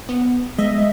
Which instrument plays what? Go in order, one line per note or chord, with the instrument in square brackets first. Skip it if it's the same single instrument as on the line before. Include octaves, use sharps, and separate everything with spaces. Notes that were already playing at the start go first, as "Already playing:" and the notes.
[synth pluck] B3
[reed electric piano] G#3 [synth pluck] D#5 E5